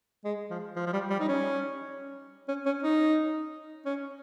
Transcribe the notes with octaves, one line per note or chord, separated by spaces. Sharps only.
G#3
F3
F3
F3
G3
G3
D#4
C#4
C#4
C#4
D#4
C#4